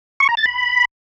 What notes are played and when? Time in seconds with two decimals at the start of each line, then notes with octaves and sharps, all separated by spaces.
0.20 C#6
0.29 A#5
0.37 A6
0.46 B5